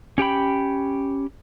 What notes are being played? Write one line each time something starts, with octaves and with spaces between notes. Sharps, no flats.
C#4 G4 G5 B5